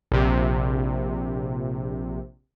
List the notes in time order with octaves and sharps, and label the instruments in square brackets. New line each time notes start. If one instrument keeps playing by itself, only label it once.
[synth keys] A#1 C3